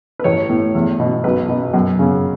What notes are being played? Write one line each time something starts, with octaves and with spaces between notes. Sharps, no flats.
B4
A1 C#5
A2
E2
B2
B1 B4
B2
F#2
C#3